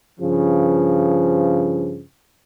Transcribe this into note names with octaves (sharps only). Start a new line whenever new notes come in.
G2 C#3 F3